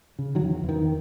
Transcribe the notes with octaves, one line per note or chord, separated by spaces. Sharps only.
C#3
D#3 F#3
E2
E2
D#3